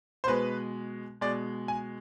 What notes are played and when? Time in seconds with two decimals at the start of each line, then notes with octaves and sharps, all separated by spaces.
0.24 C5
0.27 B2 G#3 B4
1.21 B2 G#3 D5
1.68 G#5